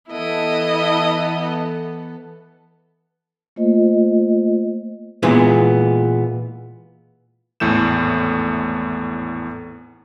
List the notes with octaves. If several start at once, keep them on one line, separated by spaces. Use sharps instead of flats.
E3 B3 E4 A4 D#5
A3 A#3 F4 C5 D#5
A#2 E3 G#3 B3
G#1 E2 A2 A3 G6 E7